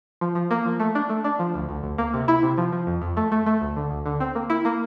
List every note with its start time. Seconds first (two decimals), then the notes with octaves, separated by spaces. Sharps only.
0.21 F3
0.35 F3
0.51 A#3
0.66 F3
0.80 A3
0.95 D4
1.09 A3
1.24 D4
1.39 F3
1.54 D2
1.69 D2
1.84 D2
1.98 A#3
2.13 C3
2.28 E4
2.43 C3
2.58 F3
2.72 F3
2.87 F2
3.02 F2
3.17 A3
3.32 A3
3.46 A3
3.61 D2
3.76 D3
3.91 D2
4.06 D3
4.20 C4
4.35 A#3
4.50 E4
4.65 A#3